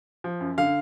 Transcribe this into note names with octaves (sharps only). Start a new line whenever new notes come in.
F3
F#2
D3 F5